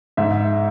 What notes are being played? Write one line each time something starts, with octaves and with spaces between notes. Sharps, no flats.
G#2 E5